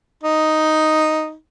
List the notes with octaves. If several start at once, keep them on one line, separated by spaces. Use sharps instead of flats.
D#4